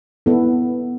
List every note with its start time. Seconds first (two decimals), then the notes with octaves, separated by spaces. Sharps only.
0.26 B3 E4 A4